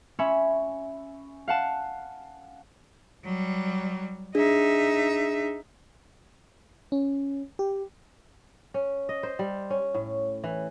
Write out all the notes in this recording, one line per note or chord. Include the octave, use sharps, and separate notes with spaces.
C#4 C#5 E5 B5
F5 F#5 A5
F#3 G3
D4 D#4 G#4 E5
C#4
G4
C#4
D#5
C5
G3
C#4
A2
E3